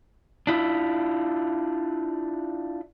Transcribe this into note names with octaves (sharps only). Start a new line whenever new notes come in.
D4 E4 F4